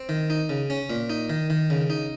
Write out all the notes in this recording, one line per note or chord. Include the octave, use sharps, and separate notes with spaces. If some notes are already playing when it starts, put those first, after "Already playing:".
Already playing: C4
D#3
D#4
C#3
C#4
A#2
D#4
D#3
D#3
C#3
D#4